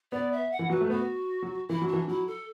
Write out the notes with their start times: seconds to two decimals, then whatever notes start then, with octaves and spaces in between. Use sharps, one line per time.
0.12 B3 D5
0.33 E5
0.52 F#5
0.59 E3
0.70 F#3 B4
0.81 A3
0.90 B3 F#4
1.42 F#3
1.69 E3 E4
1.82 F#3
1.88 D4
1.93 E3
2.08 F#3 E4
2.27 A4